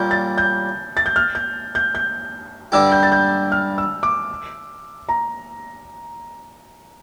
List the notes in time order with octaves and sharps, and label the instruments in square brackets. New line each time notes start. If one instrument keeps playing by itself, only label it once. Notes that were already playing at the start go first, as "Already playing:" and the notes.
Already playing: [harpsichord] A#2 G3 C#4 A#4 [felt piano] G6
[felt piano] A6
G6
A6
G6
F6
G6
G6
G6
[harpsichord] G2 D3 G3 D4 G4 [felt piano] E6
[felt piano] G6
A6
G6
F6
E6
D6
A#5